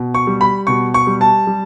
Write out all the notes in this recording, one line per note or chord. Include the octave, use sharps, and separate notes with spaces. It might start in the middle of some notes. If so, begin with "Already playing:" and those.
Already playing: B2
C#6
G3
B5
B2 C#6
C#6
G3
A5
G3